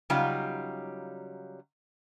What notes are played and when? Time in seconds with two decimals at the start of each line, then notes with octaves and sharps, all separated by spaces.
0.10 C#3 F#3 G3 D#4 F4 G4